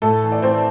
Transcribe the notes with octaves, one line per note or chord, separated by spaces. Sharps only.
A2 A3 A4
E3
D5
A2 C4 C5